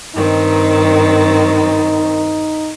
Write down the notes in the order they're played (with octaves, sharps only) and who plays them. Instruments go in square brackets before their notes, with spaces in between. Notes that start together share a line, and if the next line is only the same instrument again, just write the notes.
[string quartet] G2 D#3 C4 [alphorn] D#4